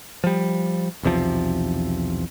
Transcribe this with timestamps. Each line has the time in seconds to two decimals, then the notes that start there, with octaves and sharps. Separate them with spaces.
0.24 F3 G3
1.03 B1 E2 C3 F3